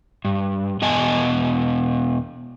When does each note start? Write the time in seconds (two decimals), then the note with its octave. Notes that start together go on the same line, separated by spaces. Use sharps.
0.25 G2
0.82 E2 B2 D#5 G#5 A5